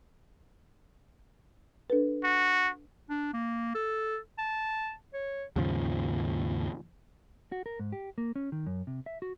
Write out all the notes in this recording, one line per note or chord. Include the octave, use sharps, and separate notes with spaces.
D4 A4 B4
F#4
D4
A#3
A4
A5
C#5
D#2 G#2 C#3 F3
F#4
A#4
G#2
G4
A#3
C#4
D#3
F#2
C3
E5
F#4